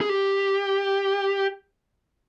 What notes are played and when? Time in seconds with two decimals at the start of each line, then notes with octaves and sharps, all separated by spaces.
0.01 G#4
0.09 G4